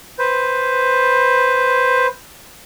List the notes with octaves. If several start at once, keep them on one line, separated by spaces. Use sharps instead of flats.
B4 C5